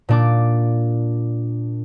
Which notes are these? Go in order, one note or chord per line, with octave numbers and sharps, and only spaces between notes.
A#2 D4 D6